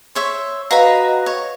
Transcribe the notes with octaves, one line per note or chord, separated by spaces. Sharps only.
C5 C#5 E5
F#4 B4 D#5 F5 A#5 B5
C#5